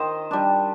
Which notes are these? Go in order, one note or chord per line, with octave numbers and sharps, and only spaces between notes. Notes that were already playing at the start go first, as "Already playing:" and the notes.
Already playing: D#3 C5 D#5
G3 D4